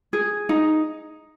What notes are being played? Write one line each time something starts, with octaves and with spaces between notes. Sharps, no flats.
G#4
D#4